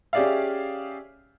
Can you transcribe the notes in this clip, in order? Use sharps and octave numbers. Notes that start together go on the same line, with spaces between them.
C#4 G4 G#4 D5 E5 F5